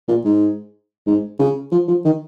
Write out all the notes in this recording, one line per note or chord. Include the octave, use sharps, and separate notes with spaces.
A#2
G#2
G#2
C#3
F3
F3
D#3